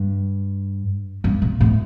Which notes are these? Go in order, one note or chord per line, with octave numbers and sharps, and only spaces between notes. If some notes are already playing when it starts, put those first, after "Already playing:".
Already playing: G2
G2
A#2
A2